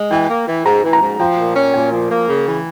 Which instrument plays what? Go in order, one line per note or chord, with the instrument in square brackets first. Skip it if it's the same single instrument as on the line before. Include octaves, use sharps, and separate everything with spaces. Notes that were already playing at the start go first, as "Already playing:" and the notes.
Already playing: [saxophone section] G#3
[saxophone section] E3 [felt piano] G5
[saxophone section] A#3
E3
[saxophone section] G#2 [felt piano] A#5
[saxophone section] E3
[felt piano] A#5
[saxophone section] G#2
[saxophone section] F3 [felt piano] G5
[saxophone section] A#2
C#4
[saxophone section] A#2 [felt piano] G#5
[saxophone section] F3
A#3
C#3
E3